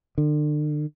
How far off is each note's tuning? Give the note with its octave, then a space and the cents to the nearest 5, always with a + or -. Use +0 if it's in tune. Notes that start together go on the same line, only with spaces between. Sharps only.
D3 +40